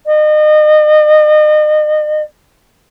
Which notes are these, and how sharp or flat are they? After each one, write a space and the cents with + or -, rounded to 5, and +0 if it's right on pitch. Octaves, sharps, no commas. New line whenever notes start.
D#5 -35